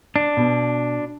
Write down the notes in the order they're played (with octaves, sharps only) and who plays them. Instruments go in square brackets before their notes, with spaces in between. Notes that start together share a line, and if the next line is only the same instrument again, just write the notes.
[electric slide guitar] D4
[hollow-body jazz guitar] B2